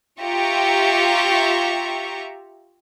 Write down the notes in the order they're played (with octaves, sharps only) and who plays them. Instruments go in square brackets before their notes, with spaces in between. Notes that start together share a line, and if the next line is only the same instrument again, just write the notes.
[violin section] F4 G4 E5 A#5 C#6